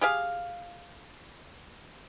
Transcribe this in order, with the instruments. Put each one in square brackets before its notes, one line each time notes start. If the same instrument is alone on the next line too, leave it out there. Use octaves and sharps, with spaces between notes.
[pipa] G4 G#4 F5